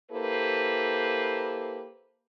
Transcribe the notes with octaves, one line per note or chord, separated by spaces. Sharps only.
A#3 E4 G4 A4 B4 C5